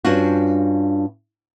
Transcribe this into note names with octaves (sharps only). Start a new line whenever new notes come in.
G2 C#4 D4 F4 F#4